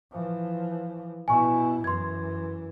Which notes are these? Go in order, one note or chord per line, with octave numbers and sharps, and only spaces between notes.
E3 F3
B2 E4 G#5 C#6
F#2 E3 C6 G#6